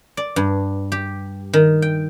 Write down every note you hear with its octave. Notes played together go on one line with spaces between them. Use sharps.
D5
G2
G4
D#3
G5